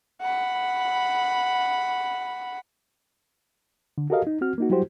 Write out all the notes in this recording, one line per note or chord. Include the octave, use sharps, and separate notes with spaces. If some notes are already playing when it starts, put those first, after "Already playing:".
F#5 B5
D3
F#4 G4 A4 A#4 D#5 F5
D#4
C4 F#4 F6
A#3 D#4 F#4
F#3 G3 E4 F#4 G4 C5